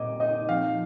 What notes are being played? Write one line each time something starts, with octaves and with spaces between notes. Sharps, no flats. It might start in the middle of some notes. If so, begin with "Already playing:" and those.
Already playing: A#2 D#5 D6
D#4 D#5
F3 F5